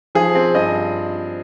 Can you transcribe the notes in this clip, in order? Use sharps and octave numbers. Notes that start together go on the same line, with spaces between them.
F3 G#4
C4
G2 D#5